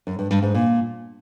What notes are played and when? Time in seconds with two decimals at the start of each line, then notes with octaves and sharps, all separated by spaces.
0.07 F#2
0.19 G2
0.31 G2
0.43 G#2
0.54 A#2